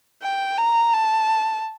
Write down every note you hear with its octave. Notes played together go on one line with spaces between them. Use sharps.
G5
A#5
A5